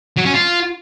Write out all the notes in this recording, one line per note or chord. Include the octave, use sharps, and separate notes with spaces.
F#3
C#4
F4